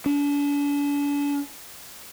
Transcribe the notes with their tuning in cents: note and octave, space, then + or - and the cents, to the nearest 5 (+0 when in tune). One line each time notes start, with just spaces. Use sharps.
D4 -40